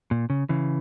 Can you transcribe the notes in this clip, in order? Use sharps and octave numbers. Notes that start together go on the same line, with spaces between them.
A#2
C#3
C#3 E3